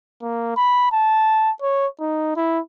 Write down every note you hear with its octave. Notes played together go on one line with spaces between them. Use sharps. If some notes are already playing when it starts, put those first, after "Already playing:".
A#3
B5
A5
C#5
D#4
E4